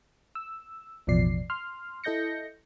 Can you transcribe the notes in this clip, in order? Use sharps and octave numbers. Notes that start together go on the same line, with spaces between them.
E6
A1 E2 B2 F3 D5 C7
C6 F6
E4 A4 D#5 G6 A#6 C#7